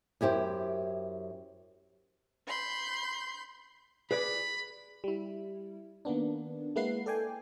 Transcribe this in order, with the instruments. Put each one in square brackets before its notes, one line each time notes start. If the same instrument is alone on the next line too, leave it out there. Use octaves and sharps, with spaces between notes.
[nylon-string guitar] F#2 E4 G4 C5
[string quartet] B5 C6 G6
[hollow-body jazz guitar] G#4 B4 D5 [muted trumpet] B5
[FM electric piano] G3 E4
D#3 A#3 B3 D4
G#3 A#3 E4 B4 F#5 C7
A4 D5 G5 G#5